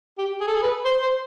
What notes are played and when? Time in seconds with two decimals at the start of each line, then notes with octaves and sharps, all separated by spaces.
0.18 G4
0.40 G#4
0.47 A4
0.55 G#4
0.63 B4
0.85 C5
1.02 C5